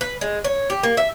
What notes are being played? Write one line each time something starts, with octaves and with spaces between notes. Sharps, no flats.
B4
G#3
C#5
G4
A#3
E5